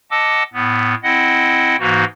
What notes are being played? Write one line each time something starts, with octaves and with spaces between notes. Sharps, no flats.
D#5 F#5 A5 D6 E6
A2 B3
C4 E4 D#5 F#5
G#2 E3 A#3 D#4 F#4